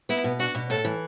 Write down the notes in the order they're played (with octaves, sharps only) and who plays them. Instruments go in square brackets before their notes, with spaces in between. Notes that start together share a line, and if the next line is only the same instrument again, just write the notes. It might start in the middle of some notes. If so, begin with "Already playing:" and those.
[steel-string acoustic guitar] B3 [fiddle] E4
[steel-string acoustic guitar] B2
[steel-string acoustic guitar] D4 [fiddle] F#4
[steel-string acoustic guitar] B2
[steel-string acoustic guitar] A2 [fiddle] A4
[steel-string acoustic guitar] E3